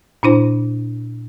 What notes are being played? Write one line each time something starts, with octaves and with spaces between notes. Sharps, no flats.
A#2 D4 E4 C5